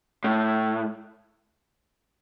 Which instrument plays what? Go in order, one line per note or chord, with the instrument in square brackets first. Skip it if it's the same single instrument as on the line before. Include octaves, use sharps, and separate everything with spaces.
[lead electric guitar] A2